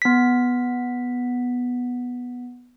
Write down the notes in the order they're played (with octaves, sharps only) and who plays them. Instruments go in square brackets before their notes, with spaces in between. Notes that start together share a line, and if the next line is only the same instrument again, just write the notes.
[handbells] B3 B6